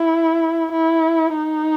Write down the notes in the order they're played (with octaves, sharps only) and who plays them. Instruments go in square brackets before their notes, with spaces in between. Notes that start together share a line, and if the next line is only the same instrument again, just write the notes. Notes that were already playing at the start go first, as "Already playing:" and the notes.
Already playing: [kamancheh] E4
E4
D#4